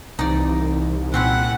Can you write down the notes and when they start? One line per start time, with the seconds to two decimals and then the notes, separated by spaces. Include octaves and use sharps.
0.19 C2 C3 E3 D#4 D5
1.14 A#2 C4 C#4 E4 F#5